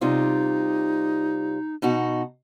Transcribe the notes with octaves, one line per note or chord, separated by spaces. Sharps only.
C3 G3 D#4 F4
B2 D#4 F#4